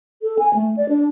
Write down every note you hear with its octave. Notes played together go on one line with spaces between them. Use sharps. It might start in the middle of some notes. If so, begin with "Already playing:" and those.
A4
G#5
A3
D5
D4